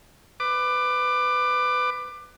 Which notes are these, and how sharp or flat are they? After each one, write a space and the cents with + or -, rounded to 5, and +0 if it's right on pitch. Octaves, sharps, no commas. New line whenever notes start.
B4 +20 D6 +20